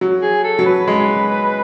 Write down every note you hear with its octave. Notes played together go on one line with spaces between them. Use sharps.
F#3
G#4
A4
F#3
B4
G#3